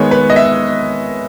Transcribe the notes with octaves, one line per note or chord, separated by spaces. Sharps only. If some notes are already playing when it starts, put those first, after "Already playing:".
Already playing: D#3 G#3 B3 C#5
B4
D#5
E5